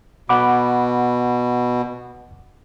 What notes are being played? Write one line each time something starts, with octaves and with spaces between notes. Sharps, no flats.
B2 F#5 B5 D6